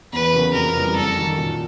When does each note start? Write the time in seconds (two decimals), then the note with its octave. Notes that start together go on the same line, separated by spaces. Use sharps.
0.13 E2 B4
0.33 C#3 F#3 A#3
0.54 F2 A#4
0.76 C#3 E3 G3
0.97 F#2 A4
1.17 D#3 F#3
1.38 A#2